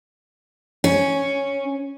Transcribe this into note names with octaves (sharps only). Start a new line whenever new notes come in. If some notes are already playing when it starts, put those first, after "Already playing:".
C#4